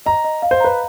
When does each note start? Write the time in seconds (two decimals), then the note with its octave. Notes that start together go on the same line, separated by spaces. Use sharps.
0.06 D#5 A#5
0.24 D#5
0.42 F5
0.51 C5
0.60 B4 A#5